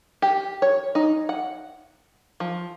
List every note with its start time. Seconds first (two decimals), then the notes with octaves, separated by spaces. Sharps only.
0.22 G4
0.62 C#5
0.95 D#4
1.29 F#5
2.40 F3